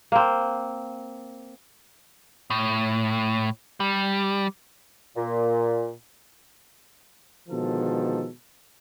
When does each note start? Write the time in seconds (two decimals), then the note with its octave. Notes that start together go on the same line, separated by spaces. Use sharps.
0.12 A#3 C4
2.50 A2
3.80 G3
5.17 A#2
7.49 B2 D3 D#3 F3 G#3 A4